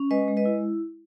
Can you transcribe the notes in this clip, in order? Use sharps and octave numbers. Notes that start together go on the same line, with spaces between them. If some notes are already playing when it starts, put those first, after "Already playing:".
Already playing: C#4
G#3 B4 D#5
G#3
B4 D#5
E4